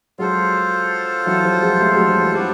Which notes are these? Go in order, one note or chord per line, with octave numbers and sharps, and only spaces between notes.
F#3 G#3 F4 A4 C5
E3 F#3
F3 G3
F#3 G#3
G3 A3
F#3 G#3
F3 G3
E3 F#3
F3 G3 B3 D4 F#4